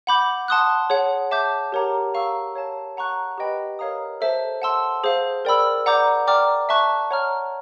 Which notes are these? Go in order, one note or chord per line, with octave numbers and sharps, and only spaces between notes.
F#5 B5 D6 G6
F#5 A5 C6 D#6 F#6
G#4 C#5 F#5
E5 A5 D6 G6
G4 A#4 C#5 F#5 A#5
F5 A#5 C#6 E6
C#5 F5 A5
F#5 A#5 C#6 F#6
G4 B4 D#5 G5 B5
A#4 C#5 F5 A#5 D#6
A4 C5 E5 A5
F#5 A5 C6 E6
G#4 C5 F5
A#4 D5 G5 B5 E6
D5 F#5 A#5 D6 G6
D5 G5 A#5 D6 F6
E5 A5 C#6 F#6
C#5 F#5 A#5 C#6 F6